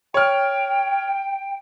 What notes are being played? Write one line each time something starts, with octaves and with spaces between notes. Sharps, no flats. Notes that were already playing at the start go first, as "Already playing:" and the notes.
C#5 G5 F6